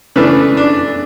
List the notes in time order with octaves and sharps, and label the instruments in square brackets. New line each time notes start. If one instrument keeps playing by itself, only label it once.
[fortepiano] C#3 E3 A3 D4 B4
D4